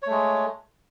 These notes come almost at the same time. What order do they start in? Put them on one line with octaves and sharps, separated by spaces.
C#5 A3 G#3